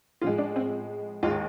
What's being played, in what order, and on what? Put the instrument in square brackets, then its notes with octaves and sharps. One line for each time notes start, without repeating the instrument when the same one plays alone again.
[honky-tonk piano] A2 F3 G#3 F4
D4
C4
D#2 D#3 G#3 F4